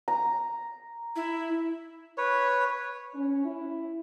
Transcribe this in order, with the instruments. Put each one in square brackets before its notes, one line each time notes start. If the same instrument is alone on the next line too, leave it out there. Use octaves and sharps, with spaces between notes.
[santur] A#5
[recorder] E4
[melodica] B4 C#5
[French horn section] C#4
E4